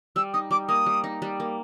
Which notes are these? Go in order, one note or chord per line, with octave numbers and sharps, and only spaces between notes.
G3 E6
D#4 D#6
G3 D6
A#3 D#6
G3
D#4
G3
A#3